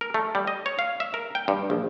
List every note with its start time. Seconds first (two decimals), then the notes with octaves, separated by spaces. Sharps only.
0.01 A#4
0.14 A3
0.35 G3
0.47 D#5
0.66 C#5
0.79 F5
1.00 E5
1.14 A#4
1.35 G5
1.48 G2
1.70 A#1